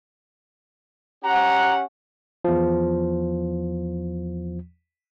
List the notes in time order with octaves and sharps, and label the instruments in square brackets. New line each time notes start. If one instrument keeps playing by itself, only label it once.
[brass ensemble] C#4 G4 F#5 [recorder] A#5
[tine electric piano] E2 F3